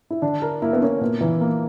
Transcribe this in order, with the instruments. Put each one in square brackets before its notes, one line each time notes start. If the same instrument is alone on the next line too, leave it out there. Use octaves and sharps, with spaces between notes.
[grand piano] E4
[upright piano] D3 [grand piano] D4
[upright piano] A#4
[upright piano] A#3 [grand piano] E4
[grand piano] B3
[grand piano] C#4 [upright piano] A#4
[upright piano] A#2 [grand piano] B3
[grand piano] E3 [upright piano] A#3
[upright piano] A#3